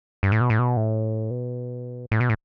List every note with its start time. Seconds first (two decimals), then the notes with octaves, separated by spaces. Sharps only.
0.23 G2
0.32 A2
0.41 B2
0.50 A2
0.59 B2
0.77 A2
1.31 B2
2.11 A2
2.20 B2
2.29 A2